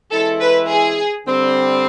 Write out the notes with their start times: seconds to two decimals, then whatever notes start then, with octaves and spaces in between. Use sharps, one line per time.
0.11 E3 G#3 C4 E4 A4
0.40 B4
0.68 G#4
1.26 D3 G3 C4